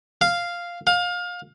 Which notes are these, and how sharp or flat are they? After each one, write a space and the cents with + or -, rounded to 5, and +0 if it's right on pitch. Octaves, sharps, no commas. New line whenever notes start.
F5 -5
F5 +25